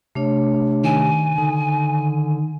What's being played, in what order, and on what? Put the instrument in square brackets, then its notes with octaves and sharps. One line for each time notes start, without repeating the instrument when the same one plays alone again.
[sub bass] C3 [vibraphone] A3 D4 C#5
[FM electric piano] D#3 [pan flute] G#5
[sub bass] D3 [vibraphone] D#4